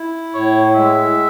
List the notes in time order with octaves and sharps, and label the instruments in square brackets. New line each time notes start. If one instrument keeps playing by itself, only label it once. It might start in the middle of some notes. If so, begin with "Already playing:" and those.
Already playing: [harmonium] E4
[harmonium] A2 [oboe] C#5
[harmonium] G#3 [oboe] E5